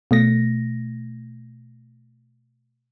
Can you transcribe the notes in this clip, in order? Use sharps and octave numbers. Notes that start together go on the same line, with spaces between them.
B2 A3 A#6